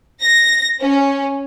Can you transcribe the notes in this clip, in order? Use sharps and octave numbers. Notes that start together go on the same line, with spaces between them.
A#6
C#4